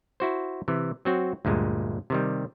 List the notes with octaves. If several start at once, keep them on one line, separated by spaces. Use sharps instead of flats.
E4 F#4 C5
C3 E3
F#3 C4 F#4
D2 G2 A#2 G#3
C3 D#3 G3